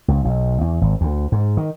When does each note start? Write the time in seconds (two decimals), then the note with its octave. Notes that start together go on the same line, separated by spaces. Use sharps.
0.08 C#2
0.25 B1
0.61 E2
0.81 G#1
1.01 D2
1.32 G#2
1.57 D#3